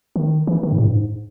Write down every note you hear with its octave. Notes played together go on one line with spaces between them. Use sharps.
D#3
E3
D#3
G#2
A2
G2
G#2